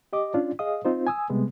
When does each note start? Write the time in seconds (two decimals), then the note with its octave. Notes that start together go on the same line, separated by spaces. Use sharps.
0.13 G4 D#5 D6
0.34 C#4 D4 F4 D5
0.59 G#4 D#5 F5 D#6
0.85 C4 D#4 F4 C5
1.07 G#5 D#6 E6
1.30 C3 G3 G#3 B3